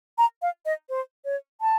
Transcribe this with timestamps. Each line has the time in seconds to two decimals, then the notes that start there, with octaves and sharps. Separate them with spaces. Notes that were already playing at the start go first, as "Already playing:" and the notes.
0.18 A#5
0.42 F5
0.65 D#5
0.89 C5
1.25 C#5
1.61 A5